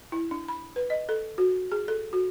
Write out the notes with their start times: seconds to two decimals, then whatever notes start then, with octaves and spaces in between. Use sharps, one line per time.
0.12 E4
0.31 D4
0.48 B5
0.76 B4
0.90 D#5
1.09 A4
1.38 F#4
1.72 G#4
1.88 A4
2.13 F#4